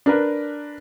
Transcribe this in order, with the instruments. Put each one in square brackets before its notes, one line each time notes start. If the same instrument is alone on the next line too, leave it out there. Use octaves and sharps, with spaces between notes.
[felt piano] D4 A#4 B4